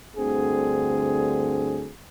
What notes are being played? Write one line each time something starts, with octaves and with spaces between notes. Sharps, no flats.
D2 G2 D3 C4 G#4